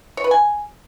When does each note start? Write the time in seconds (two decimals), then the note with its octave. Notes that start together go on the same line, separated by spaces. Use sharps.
0.17 C#5
0.24 B4
0.31 G#5